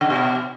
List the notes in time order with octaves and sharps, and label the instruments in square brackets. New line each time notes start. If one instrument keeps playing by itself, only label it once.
[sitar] C#3
B2